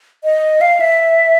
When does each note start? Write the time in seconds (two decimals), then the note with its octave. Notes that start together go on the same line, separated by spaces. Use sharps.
0.24 D#5
0.61 F5
0.80 E5